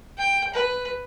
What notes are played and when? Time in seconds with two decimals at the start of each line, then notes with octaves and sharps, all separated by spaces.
0.18 G5
0.54 B4